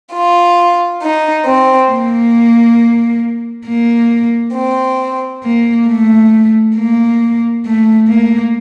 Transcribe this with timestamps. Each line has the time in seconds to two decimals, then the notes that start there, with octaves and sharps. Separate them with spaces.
0.14 F4
1.02 D#4
1.46 C4
1.91 A#3
3.67 A#3
4.55 C4
5.44 A#3
5.87 A3
6.77 A#3
7.65 A3
8.08 A#3